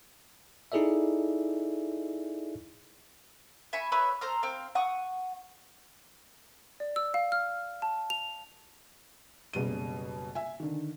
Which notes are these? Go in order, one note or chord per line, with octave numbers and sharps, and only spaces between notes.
D#4 E4 G#4 A4 D5 E5
E5 G#5 B5 C#6
B4 C#5 E5 B5
A4 C5 A#5 F6
C4 F5
F#5 C#6 D#6
D5
E6
F5
F6
A5
F7
F#1 B2 G3 D#7
E5 G#5
D3 D#3